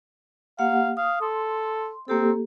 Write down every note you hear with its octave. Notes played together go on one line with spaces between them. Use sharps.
A#3 G4 F5 F#5
F5 D#6
A4 C6
A#3 C4 G4 A4